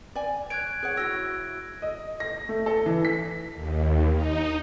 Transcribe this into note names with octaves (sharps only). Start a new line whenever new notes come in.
D5 G#5
C#5 F#6 G#6 D7
G#4 C#5 F#5
E4 F#4 C#5 E6 A#6
D#5
A#6
A3
A4
E3
B6
D#2
D#4